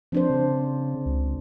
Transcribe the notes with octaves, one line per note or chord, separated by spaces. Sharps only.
F3 C4 D4 C5
C#3
C#2